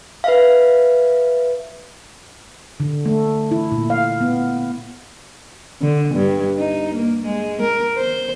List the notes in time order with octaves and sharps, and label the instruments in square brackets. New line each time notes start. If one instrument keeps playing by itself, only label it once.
[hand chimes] B4 E5 F5
[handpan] D3
A3
E4
A#2
F5
B3
[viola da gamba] D3
G2
D#4
A#3
G#3
A#4
C5